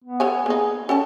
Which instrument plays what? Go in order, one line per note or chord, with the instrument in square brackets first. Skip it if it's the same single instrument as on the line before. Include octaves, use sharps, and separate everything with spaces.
[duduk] B3
[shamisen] A4 C#5 G#5
[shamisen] A#3 D#4 [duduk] G#4
[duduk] C#4 [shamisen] A4 G5 A5